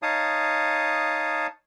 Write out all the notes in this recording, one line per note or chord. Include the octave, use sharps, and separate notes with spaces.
D#4 C#5 F5 A5 D#6